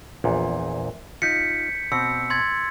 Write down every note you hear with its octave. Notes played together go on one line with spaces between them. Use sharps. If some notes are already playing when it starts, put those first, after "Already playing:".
A#1 E2 A#2
D#4 F4 G6 B6 C#7
B2 C4 E6 C#7
C6 G#6 A6